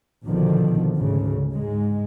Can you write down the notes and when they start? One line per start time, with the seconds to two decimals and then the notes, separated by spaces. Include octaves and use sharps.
0.24 A#1 B2 D3 D#3 F3
0.96 D2 G#2 C#3
1.52 G#2 G#3